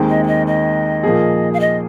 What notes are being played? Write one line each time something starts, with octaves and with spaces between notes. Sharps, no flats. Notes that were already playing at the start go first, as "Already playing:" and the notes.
Already playing: D#2 D#3 G#3 C4
D#5
F5
D#5
D#5
A#2 F3 A#3 G#4
F5
D#5